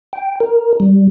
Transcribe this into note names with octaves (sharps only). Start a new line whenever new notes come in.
G5
A#4
G3